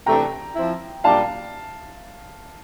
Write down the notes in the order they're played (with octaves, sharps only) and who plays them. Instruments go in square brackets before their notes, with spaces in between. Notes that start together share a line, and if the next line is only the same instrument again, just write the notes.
[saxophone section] C3 E3 A3 D4 [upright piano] G5 A#5
[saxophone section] F3 C4 E4
[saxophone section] A#2 G3 A#3 D4 [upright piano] F5 A5